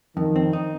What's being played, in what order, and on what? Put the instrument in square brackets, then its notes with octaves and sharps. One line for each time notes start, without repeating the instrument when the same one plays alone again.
[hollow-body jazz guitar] F2 [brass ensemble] D#3
[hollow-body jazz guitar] C4
D#4